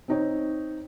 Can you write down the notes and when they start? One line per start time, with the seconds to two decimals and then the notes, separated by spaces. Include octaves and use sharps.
0.08 C4 D#4 C#5